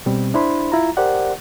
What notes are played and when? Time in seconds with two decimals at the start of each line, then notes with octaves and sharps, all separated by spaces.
0.06 B2 G3 C4
0.34 D4 E4 C5 B5 C6
0.72 E4 F4 A#5
0.97 G4 A#4 C5 D5 F#5